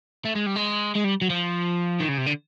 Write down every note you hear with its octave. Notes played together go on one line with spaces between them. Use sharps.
A3
G#3
G3
G#3
G#3
G3
F#3
F3
D#3
C#3
C3
D3